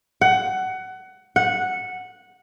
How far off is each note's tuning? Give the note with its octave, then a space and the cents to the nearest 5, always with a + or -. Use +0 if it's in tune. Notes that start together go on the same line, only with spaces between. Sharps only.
F#5 +20
F#5 -10